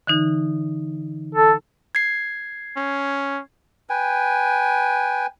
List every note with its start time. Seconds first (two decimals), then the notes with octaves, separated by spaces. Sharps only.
0.07 D3 E3 D#4
1.35 A4
1.95 G#6 C7
2.77 C#4
3.90 B4 G5 G#5